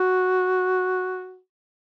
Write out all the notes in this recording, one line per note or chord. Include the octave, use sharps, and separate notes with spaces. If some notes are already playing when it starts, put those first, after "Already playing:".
Already playing: F#4